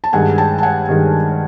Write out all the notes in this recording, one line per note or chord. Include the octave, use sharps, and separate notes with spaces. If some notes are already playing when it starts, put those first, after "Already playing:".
A5
G2 D#3 G#3 F#5 G#5
G5 A5
A5
F#5 G#5
G2 D#3 G#3